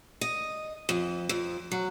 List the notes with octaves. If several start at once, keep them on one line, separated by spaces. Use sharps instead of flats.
D#5
F2
F2
F#3